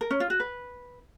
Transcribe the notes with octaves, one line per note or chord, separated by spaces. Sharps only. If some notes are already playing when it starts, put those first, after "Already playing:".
A#4
C#4
F4
F#4
B4